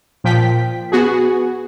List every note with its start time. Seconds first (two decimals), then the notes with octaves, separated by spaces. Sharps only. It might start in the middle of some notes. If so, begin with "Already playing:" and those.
0.24 A#2 F3 G5 B6
0.92 B3 F#4 G#4